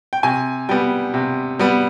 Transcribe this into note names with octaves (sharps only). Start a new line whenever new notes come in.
G5
C3 G#5
G3 B3 G5
C3
G3 B3